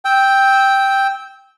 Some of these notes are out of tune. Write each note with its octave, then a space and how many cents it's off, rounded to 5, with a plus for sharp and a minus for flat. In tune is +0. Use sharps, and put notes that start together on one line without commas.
G5 +0 E6 -20